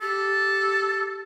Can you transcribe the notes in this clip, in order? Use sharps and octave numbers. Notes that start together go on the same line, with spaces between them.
G4 A4